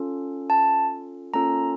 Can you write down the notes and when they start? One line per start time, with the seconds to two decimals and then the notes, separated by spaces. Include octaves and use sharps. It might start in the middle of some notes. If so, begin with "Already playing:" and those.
Already playing: C#4 F4 A4
0.50 A5
1.34 A#3 C#4 F4 A4 A#5